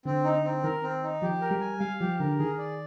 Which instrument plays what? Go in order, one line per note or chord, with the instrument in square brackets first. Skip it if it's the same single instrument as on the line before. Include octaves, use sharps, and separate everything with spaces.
[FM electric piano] D3 [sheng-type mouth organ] C4
[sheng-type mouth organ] D#4
C4
[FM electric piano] D#3 [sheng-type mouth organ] A#4
[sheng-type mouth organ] C4
D#4
[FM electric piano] F3 [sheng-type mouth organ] G4
[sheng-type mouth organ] A#4
[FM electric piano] G3
[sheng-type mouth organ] G#5
[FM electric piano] G3 [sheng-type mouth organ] F5
[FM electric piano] F3 [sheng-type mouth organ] G4
[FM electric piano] D3 [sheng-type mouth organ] A#4
[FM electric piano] D#3 [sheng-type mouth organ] G#4
[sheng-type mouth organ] D5